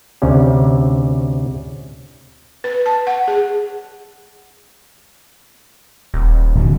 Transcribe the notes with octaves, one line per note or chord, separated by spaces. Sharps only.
D2 C3 C#4
B4
A5
F#5
G#4
D#1
D1 D3 F#3